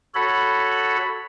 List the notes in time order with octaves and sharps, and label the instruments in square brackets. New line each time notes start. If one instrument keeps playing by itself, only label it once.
[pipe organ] F#4 A4 C#5 B5